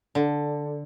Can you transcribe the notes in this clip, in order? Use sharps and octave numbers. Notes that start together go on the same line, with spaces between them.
D3